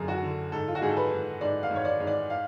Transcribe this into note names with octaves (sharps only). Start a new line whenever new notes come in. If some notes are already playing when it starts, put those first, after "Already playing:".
Already playing: F#2 D3 G#4
F#4
D3
G#2 A4
F4
F#4
G#2 G#4
A4
B4
G#2
G#2 D5
F5
G#2 C#5
D5
G#2
D5
F5